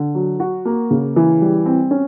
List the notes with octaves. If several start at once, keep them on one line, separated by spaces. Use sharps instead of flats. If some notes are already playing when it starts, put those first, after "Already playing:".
Already playing: D3
F#3
F#4
A#3
C#3
E3
G3
C4
C#4